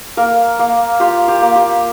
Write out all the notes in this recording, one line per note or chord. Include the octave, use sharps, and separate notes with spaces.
A#3 A#4
A#3
F4 G4
G4
A#3
G4